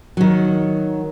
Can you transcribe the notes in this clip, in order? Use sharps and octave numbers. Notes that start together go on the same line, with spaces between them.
D#3 F#3